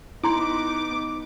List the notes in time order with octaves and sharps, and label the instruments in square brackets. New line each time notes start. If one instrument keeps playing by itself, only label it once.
[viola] B3 D#4 [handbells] E4 A#5 C6 [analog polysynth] D6